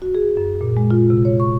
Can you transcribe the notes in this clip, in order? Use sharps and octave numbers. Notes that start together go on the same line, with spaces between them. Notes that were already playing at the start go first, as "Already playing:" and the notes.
F#4
G#4
F#2
A#2
G#3
F4
C3
C#5
C#6